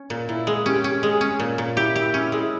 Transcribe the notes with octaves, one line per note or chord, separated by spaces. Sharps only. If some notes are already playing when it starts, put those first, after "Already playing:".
Already playing: C#4
A#2
A#2 E4
G#3
C#4 G4
C#4
G#3 G#4
C#4
A#2
A#2
E4 G4
G4
C#4 E4
G#3